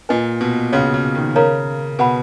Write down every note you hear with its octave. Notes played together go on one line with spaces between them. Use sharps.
A#2 B4 D#5 G#5
B2
C#3 C#4 F#4 C#5 F5
C#3
D#3
C#3 A#4 C#5 F5 A#5
B2 B4 F#5 B5